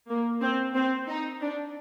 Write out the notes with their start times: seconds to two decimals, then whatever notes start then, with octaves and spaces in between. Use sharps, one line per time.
0.09 A#3
0.42 C4
0.75 C4
1.08 D#4
1.42 D4